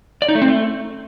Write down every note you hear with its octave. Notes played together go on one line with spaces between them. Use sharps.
D5
D#4
A3
C4
A3